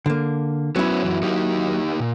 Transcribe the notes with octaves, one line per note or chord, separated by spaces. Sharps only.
D3 A#3
F#3 B3 C#4 E4
F#2 E3
A#3 D#4 G4
A#2